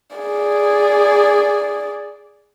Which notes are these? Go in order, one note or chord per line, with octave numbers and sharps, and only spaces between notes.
G#4 D5